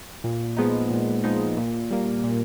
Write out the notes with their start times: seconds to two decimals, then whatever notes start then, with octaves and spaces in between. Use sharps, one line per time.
0.24 A#2
0.57 F3 G#3 B3 D#4
0.91 A#2
1.24 F3 G#3 B3 D#4
1.57 A#2
1.91 G3 A#3
2.24 A#2